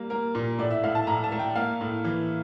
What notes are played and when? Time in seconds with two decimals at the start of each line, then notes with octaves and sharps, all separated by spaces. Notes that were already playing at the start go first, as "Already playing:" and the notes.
Already playing: G3 A#3
0.10 A#3 A#4
0.35 A#2
0.58 A2 D5
0.71 E5
0.83 A2 F5
0.95 A5
1.07 A2 A#5
1.24 A5
1.32 A3
1.39 G5
1.56 A#3 F5
1.81 A2
2.04 E3